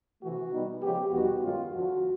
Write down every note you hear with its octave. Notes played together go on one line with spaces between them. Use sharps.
C3 E3 A3 F#4
B2 G3 B3 D#4
C#3 F3 G#3 B3 G4
E2 B2 G3 B3 D#4 F#4
G2 D#3 G#3 C#4 F4
F2 D3 F3 F#4